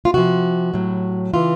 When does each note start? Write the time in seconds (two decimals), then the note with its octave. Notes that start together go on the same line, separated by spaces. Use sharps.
0.05 F4
0.14 C3 F3 F#4
0.73 A2 F#3
1.33 C#3 E3 F4